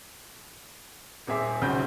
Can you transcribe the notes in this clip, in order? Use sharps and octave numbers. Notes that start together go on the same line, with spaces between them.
D#1 C4 G#4 E5 D6
B1 F2 C#3 C4 F#4 G6